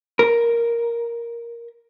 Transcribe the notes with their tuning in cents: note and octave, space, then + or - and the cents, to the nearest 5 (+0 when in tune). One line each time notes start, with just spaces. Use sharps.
A#4 +5